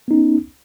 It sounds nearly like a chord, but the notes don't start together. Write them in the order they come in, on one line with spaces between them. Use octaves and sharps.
B3 D#4 C#4